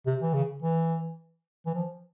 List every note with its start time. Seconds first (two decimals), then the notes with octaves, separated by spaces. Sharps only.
0.06 C3
0.22 E3
0.34 C#3
0.63 E3
1.66 E3
1.75 F3